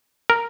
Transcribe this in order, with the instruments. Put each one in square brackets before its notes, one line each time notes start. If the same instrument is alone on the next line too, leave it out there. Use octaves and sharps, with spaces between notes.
[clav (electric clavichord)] A#4